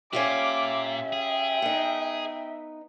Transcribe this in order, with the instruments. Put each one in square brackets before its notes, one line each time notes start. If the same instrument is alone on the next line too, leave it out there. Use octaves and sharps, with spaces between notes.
[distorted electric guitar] A#2 [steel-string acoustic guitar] C#4 F4 G4 [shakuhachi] E5 [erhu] D6
[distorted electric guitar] G#4 [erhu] G5
[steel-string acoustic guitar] B3 D#4